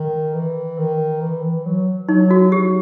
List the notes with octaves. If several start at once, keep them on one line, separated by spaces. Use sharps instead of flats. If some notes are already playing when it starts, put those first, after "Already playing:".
Already playing: D#3
E3
D#3
E3
E3
F#3
F#3 D#4
F#4
F#3 G4